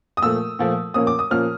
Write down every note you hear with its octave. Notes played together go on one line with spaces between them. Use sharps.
D#6
A#2 F3 A3 E6
A#2 F3 A3
A#2 F3 A#3 C#4 D#6
D6
D#6
A#2 F3 A#3 C#4 F6